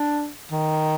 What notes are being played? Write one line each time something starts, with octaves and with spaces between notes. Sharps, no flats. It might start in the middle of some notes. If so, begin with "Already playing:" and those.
Already playing: D4
D#3